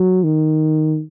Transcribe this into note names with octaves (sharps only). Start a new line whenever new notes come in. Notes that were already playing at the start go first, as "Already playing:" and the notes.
Already playing: F#3
D#3